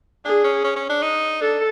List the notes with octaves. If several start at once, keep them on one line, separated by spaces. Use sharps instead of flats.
D4 G#4
C#4
C#4
C#4
D4
D#4
D4 A4